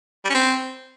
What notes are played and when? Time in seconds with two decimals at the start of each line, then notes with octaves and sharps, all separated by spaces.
0.25 G3
0.30 C#4
0.35 C4